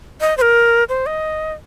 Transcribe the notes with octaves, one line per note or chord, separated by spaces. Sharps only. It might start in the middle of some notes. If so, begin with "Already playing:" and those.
D#5
C5
A#4
C5
D#5